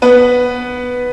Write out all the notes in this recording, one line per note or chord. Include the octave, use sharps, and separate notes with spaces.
B3 B4